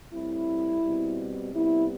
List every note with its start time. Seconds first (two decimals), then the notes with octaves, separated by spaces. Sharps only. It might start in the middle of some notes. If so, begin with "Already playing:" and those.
0.11 A2 G3 C4 E4
0.82 B2 G3 C4
1.52 C3 G3 B3 E4